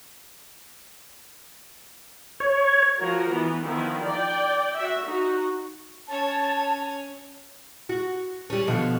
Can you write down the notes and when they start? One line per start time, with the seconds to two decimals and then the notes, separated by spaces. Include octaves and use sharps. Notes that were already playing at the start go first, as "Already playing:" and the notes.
2.40 C#5
3.00 F3 F#4 A#4
3.30 E3 B3
3.63 D#3 F3 B3 E4
4.05 D5 G5
4.76 F#4 E5
5.05 D#4 F#4
6.08 C#4 C#5 A5
7.89 F#4
8.50 G3 C#4
8.67 B2 D3 F3